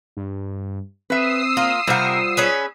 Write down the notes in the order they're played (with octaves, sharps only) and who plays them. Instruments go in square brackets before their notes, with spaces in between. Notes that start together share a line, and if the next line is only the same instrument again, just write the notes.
[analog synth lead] G2
[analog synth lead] C4 [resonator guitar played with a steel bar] B4 E5 [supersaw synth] D#6 E6 C7
[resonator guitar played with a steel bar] A#3 [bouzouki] F4
[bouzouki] C3 A#4 [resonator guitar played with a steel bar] G3 C5 F#5 [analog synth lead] F4
[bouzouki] C#4 G#4 B4